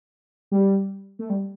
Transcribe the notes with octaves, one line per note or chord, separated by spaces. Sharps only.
G3
A3
G3